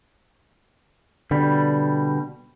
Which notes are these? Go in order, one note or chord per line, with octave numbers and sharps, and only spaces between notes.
B2 D3 G3